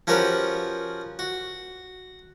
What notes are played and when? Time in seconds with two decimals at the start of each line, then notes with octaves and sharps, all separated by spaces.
0.07 F3 C#4 F#4 G4 A#4 B4
1.19 F#4